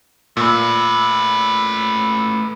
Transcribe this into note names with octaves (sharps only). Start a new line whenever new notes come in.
A#2 A3 B4